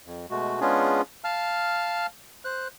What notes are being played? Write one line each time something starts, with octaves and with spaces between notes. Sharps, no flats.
F2
B2 G#3 A3 F#4
G#3 B3 C#4 D4 F4 G#4
F5 A5 F6
C5 F#6